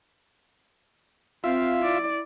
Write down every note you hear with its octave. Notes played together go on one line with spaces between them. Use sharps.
C4 F4 E5 F5
E4 D5